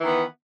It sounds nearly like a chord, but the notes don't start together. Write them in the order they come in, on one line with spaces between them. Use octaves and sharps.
E3 D#3 B3